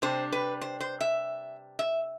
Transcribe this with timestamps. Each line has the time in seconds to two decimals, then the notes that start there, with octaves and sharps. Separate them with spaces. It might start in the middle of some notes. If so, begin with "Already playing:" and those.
0.02 C3 G3 D4 C5
0.32 B4
0.61 C5
0.80 C5
1.01 E5
1.79 E5